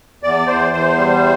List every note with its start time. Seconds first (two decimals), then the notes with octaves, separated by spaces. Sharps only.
0.23 E2 D5
0.48 E2 C5
0.73 E2 C5
0.97 G3